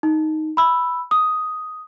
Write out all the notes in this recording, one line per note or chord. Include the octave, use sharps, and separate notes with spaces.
D#4
B5 E6
D#6